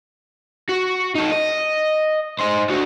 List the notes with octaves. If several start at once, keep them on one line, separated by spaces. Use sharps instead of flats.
F#4
D#4 A4
D#5
D#4 C5
D3 F#4